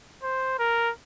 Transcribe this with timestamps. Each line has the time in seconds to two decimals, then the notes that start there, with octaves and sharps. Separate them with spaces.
0.23 C5
0.59 A#4